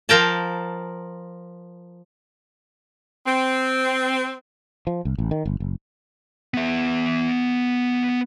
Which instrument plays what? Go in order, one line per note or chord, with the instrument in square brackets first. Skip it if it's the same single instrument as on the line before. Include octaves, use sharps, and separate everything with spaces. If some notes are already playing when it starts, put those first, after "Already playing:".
[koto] F3 A#4 G5 A5
[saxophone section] C4
[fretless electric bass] F3
C2
A1
D#3
G1
F#1
[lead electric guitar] B3 E5